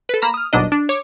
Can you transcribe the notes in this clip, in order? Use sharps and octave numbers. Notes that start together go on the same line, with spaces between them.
A4 B4
A#3 A#5 B5 E7
D#6 F6
G1 D#2 B2 F#3 D4 D#5
D4
C#5 D6